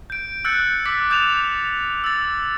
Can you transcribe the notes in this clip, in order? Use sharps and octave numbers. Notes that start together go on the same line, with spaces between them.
G6 D7
E6 F#6 G6 A6 C#7
D6 E6 A6 B6
D6 D#6 G6 A6 E7 F7
E6 A6